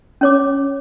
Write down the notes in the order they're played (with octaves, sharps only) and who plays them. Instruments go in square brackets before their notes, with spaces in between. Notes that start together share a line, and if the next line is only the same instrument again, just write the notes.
[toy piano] C#4 C#5 D6